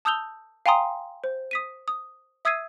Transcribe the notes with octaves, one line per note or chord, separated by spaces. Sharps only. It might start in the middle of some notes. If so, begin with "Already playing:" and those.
A5 D#6 E6 G6 F7 G7
F5 G5 G#5 A#5 C6 D#6
C5
D#6 B6 D#7
D#6
E5 D#6 E6 G#6 C7 D#7